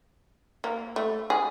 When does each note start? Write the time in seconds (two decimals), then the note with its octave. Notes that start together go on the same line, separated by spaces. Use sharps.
0.64 A#3
0.96 A3
1.30 G#4